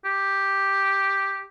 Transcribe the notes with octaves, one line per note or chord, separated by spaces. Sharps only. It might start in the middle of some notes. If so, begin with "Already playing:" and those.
G4